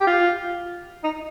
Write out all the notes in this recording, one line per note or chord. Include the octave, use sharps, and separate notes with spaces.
G4
F4
D#4